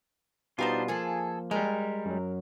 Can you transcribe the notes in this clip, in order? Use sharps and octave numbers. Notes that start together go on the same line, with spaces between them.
B2 G3 B3 D4 D#4 F4 C5
F3 A#3 G#4 A4
G3 G#3 A#4
F#2 F#3